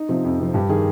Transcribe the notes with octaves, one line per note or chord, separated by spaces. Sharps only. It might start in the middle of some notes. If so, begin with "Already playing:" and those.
Already playing: D#4
C3 F3
F2
C3 F3
G2 G4
D#3 G#4